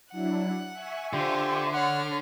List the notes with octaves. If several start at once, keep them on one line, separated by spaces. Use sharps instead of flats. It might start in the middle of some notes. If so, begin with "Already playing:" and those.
F#3 D4 E4 F#5
E5 G#5 C#6
D3 F4 G4 C5
C#5 F#5 F6